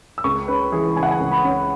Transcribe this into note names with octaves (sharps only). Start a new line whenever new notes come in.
E6
C#2 C#6
C#4 B4
E3 G#4
C#3 G#5
F#5
G#5
C#2
B5
C#4